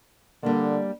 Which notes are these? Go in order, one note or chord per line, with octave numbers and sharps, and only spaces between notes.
D3 G3 A#3 D4